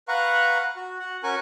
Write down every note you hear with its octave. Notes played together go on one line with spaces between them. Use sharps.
B4 F5 F#5 A#5 C#6
F#4
F#4 F#5
C#4 F#4 A#4 G#5 C#6